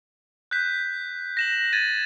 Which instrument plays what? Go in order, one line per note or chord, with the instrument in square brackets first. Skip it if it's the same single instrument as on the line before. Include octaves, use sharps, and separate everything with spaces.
[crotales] F#6 G6 B6
A#6 E7 F#7
G#6 A6 D#7